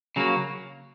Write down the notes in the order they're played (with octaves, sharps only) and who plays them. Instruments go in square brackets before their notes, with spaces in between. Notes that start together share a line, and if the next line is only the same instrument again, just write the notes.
[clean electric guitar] C#3 F#3 A#3